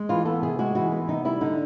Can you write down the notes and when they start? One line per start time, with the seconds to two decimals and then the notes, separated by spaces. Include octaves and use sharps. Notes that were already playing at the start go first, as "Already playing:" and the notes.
Already playing: G#3
0.09 E3 F4
0.25 B3 A4
0.42 C3 G#4
0.59 G#3 F#4
0.75 E3 F#4
0.92 B3
1.08 C3 D#4
1.25 G3 E4
1.41 D3 D#4